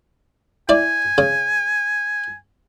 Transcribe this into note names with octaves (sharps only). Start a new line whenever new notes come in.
E4 D5 G#5
C#3